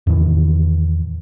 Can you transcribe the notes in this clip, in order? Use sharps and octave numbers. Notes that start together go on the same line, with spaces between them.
E2 A2 D#3 E3